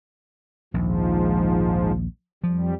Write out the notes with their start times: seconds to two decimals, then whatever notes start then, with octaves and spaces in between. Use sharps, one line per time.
0.74 A#1 D#2 G#2 F3
2.44 F2 F3 G3